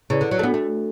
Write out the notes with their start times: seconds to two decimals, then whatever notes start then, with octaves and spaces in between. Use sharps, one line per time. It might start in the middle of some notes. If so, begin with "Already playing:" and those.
0.10 C#3 E4 B4 D5
0.21 D3
0.31 F#3
0.39 A3
0.43 B3 D4 F#4 A4
0.54 A3